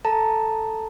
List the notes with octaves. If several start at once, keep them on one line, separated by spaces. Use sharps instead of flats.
A4 A5 A#5